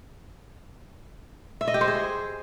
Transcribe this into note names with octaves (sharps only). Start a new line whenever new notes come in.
E5
D#5
G4
C5
G#4